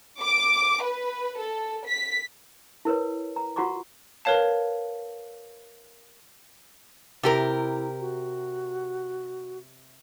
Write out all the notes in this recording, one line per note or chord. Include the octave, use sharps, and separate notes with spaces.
D6
B4
A4
B6
E4 A#4 B4 C#5
A#5
F4 F#4 F#5 A#5 C#6 D6
A#4 B4 C#5 F5 A5
C3 E4 G4 A#4
F#4